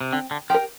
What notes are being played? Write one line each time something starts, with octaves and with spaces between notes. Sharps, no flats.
C3
D3 C4
D3
F3 G4 A#4